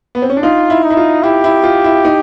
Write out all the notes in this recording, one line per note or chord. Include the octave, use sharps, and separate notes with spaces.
B3
C4
C#4
D4
D#4 F4
E4
D#4
E4
F4
E4 G4
E4
F4
E4
D#4